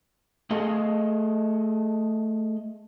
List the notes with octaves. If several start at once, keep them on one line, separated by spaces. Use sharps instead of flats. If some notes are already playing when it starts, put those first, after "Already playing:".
A3 G#4 A4 D#5 F5